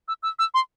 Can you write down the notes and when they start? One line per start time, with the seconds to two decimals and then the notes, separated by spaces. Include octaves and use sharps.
0.08 E6
0.23 E6
0.39 E6
0.54 C6